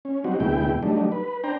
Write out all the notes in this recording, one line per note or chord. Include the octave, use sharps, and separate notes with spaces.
C#4
F#3 G3 C4 D#4 F#4
D2 B2 G#3 E4 G5
F#3 G3 A3 D4 D#4
B4
D4 C5 G5 A#5